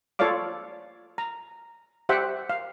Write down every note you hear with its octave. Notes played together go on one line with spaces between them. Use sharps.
F4 A4 C#5 D5 F5 D6
A#5
G4 C5 E5 F#5 G5
F5